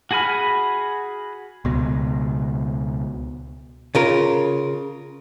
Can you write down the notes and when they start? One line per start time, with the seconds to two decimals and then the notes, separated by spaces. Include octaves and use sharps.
0.11 F#4 G#4 G#5 B5 F6
1.65 C#2 B2
3.95 C#3 F4 A#4